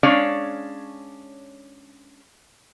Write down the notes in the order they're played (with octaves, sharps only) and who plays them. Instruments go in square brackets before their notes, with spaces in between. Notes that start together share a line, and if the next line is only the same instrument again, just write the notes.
[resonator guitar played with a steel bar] G#3 C#4 D4 C#5 D5 F5